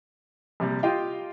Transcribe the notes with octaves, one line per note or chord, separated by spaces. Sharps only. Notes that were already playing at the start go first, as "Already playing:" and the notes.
A#1 C3 G3
F4 G4 D#5 F5 G5